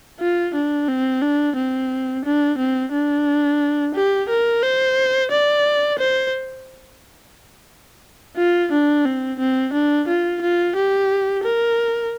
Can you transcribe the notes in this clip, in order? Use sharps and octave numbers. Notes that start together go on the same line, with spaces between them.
F4
D4
C4
D4
C4
D4
C4
D4
G4
A#4
C5
D5
C5
F4
D4
C4
C4
D4
F4
F4
G4
A#4